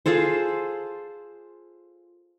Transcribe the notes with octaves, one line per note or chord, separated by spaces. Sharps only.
F4 G#4 A4 C5